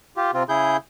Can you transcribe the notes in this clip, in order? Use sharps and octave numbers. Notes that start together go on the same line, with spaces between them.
F4 G4
C3 C4 F4
C#3 E4 G#4 G6